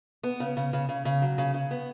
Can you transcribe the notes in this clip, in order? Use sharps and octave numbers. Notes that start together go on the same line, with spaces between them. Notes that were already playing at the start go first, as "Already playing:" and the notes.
B3
C#3
C#3
C#3
C#3
C#3
F#3
C#3
C#3
B3